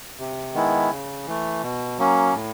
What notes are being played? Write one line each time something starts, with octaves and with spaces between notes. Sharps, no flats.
C3
D#3 G#3 B3 E4
C#3
E3 A3
B2
F#3 A#3 C#4
A2